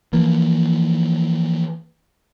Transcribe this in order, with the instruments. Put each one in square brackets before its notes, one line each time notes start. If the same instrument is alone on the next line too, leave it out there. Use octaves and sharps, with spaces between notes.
[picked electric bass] E3 F3 A#3